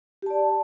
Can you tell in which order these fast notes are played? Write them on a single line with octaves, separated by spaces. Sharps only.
G4 A5 D5